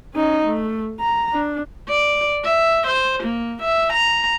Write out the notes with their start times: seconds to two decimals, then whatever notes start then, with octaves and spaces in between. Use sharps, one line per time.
0.15 C#4 D#4
0.47 A3
1.00 A#5
1.33 D4
1.89 D5
2.44 E5
2.87 C5
3.23 A#3
3.62 E5
3.93 A#5